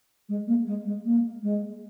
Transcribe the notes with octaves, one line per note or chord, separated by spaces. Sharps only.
G#3
A#3
G#3
G#3
A#3
G#3